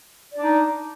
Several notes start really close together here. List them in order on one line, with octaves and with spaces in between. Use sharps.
D5 D4 D#4